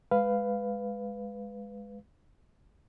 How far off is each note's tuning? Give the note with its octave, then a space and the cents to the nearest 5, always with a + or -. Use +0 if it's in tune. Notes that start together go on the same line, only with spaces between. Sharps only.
G#3 +0 B4 +10 F5 -5